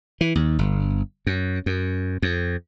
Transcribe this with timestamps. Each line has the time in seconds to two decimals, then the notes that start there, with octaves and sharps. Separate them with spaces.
0.21 E3
0.35 D#2
0.59 G1
1.27 F#2
1.66 F#2
2.22 F2